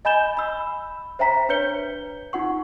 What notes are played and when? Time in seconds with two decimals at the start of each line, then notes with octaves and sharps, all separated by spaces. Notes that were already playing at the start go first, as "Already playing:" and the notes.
0.05 D#5 G#5 B5 G6 E7 G7
0.37 B5 E6
1.19 C5 E5 G5 A#5 B6
1.49 D4 B4 C#5 G6 C#7 G7
2.33 D#4 F4 F#5 C#6